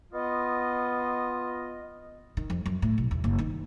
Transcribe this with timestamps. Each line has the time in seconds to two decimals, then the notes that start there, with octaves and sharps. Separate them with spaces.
0.13 B3 F4 D#5
2.37 D#3
2.50 F2
2.66 F#2
2.82 A2
2.98 B1
3.11 E2
3.24 F#1
3.39 D#3